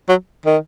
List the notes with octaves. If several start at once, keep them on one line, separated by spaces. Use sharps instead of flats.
F#3
D#3